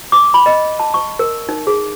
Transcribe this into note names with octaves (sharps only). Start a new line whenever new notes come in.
D6
B5
D#5
A5
C#6
A#4
D#4
G#4